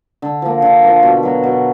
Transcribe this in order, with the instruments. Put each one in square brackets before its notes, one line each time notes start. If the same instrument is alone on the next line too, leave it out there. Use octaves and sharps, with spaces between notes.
[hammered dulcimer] D3
F3 A#3
D3
F3 A#3
B2
F#3 B3
B2